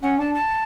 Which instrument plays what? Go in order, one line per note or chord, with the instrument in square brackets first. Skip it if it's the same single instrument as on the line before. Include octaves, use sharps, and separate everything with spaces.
[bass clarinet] C#4 [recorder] F#5
[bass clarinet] D4 [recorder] A5
[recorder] A5